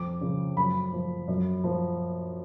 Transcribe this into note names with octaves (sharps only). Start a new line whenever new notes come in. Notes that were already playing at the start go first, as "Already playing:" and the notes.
Already playing: F2 D6
C#3 F3
F#2 B5
F3
F#2
F3